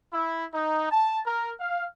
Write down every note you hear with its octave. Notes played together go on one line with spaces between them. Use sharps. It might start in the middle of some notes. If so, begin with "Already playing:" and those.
E4
D#4
A5
A#4
F5